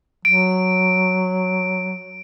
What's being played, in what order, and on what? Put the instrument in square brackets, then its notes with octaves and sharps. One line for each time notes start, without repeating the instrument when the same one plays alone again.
[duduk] F#3 [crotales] D7